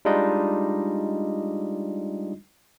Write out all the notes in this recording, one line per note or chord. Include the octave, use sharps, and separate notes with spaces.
G3 G#3 D4 D#4 F4 D#5